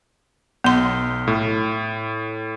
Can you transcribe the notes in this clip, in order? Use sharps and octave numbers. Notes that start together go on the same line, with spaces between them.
B1 B3 C6
A2